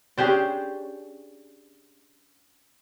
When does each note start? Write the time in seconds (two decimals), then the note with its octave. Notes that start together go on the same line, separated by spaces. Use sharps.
0.18 C#4 D4 G4 G#4 C5 D5